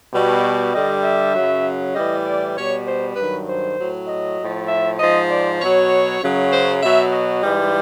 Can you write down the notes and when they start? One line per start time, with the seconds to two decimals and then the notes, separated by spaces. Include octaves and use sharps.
0.12 B2 G3
0.73 G2 D3 G3 D#5
1.03 E5
1.34 F#2 C#3 F#3
1.94 A2 E3 G3 D#5
2.24 D5
2.55 B2 G3 C#5
2.86 C5
3.16 G2 D#3 F#3 B4
3.47 C5
3.78 A2 F#3
4.08 D#5
4.38 A2 F3
4.68 E5
4.98 G#2 F3 D#5
5.29 D5
5.59 B2 F#3 C#5
6.21 F#2 C#3 F#3
6.51 C5
6.82 B2 F#3 E5
7.12 D#5
7.42 G#2 E3 G3